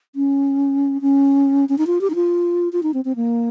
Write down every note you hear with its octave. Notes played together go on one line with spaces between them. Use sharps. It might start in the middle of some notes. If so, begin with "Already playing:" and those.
C#4
C#4
C#4
D#4
F4
G4
D#4
F4
F4
D#4
C4
C4
A#3